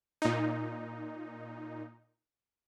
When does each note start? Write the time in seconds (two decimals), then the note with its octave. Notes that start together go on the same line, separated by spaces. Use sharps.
0.22 A#2 D#4